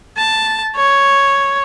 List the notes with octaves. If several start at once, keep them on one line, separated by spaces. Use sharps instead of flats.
A5
C#5